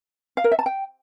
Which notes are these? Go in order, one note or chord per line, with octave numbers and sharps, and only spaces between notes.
F5
A#4
E5
A5
G5